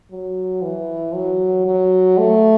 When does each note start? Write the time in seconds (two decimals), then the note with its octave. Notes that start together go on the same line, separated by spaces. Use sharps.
0.11 F#3
0.62 E3
1.14 F#3
1.66 F#3
2.18 A3